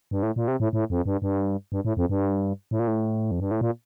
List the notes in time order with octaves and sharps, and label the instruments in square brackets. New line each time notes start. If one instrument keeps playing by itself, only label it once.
[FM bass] G2
A2
A#2
C3
A2
A2
F2
G2
G2
G2
A2
F2
G2
A2
A#2
A2
F2
G2
A2
A#2